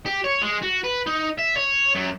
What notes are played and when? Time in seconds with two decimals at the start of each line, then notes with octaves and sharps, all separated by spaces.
0.06 G4
0.24 C#5
0.41 G#3
0.62 F#4
0.84 B4
1.06 D#4
1.38 E5
1.56 C#5
1.95 F#2